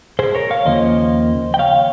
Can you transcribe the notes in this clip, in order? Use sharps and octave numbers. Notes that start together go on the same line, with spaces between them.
G#4 C5
A#4 C#5
C#5 F5
D#2 C#3 F3 A#3 C5 D#5
G5
C#5 F5